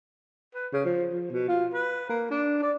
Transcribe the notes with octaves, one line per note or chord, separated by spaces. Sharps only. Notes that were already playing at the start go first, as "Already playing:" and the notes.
B4
C#3
F3
F3
B2
F4
B4
A#3
D4
D5